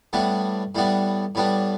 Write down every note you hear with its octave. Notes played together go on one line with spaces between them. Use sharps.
A2 G3 B3 D4
A2 G3 B3 D4
A2 G3 B3 D4